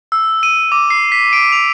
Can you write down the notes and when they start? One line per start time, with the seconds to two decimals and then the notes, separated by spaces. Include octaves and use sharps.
0.12 E6
0.43 D#7
0.72 D6
0.90 C7
1.12 B6
1.33 D7
1.52 F7